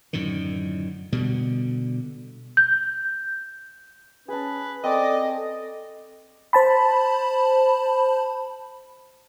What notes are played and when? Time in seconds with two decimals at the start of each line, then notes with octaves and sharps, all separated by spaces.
0.13 F#2 A2 D3 D#3
1.12 B2 D3 G3
2.57 G6
4.28 C#4 G#4 B4 A5
4.84 C4 A4 D5 D#5
6.53 C5 A5 B5